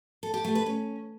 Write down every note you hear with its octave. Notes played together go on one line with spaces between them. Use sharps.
A4
G4
A3
B4
C#4